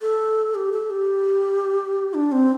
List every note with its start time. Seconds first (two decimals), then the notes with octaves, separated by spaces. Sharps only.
0.02 A4
0.55 G4
0.72 A4
0.90 G4
2.14 D4
2.32 C4